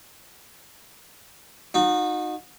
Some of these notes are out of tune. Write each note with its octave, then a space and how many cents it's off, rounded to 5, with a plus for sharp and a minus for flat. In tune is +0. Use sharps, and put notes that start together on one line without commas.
D#4 -15 F#4 -35